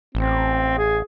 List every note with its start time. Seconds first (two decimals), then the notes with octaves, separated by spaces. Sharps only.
0.15 A1 C4
0.78 G#4